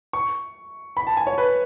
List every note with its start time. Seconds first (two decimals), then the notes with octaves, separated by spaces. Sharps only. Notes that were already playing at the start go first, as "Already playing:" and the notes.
0.13 C#6
0.97 B5
1.07 A5
1.17 G#5
1.27 C#5
1.38 B4